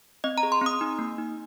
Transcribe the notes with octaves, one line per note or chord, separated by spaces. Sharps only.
C4 D#5
A#5
G#4
C6
C4 D#6
D#4
A#3
D#4